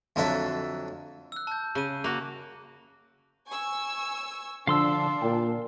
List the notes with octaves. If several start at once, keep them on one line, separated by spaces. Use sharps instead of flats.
F2 D3 F#3 A4 E5
E6 F#6
A5 G6
C#3 F#6 D#7
A#3 F#4
G#5 C#6 E6
D3 F3 D4 F5 C6 E6
A#2 G5